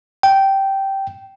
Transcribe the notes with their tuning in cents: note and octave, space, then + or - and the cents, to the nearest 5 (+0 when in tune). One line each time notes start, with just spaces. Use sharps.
G5 -10